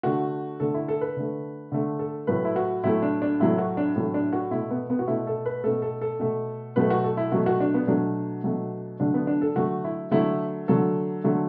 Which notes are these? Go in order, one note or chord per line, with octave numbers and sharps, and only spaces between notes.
D3 A3 F#4
D3 A3 A4
E4
A4
B4
D3 A3
D3 A3
A4
A2 F#3 A3 B4
E4
F#4
A2 F#3 A3 E4
D4
D4
A2 F#3 A3 E4
F#4
D4
A2 F#3 A3 D4
D4
F#4
B2 A3 E4
B3
B3
F#4
B2 A3 E4
A4
B4
B2 A3 A4
A4
A4
B2 A3
B2 F#3 A3 B4
F#4
A4
E4
B2 F#3 A3 F#4
F#4
D4
B3
B2 F#3 A3 D4
B2 F#3 A3
D3 F#3 A3 D4
B3
D4
A4
D3 F#3 A3 F#4
E4
D3 F#3 A3 E4
D3 F#3 A3 A4
D3 F#3 A3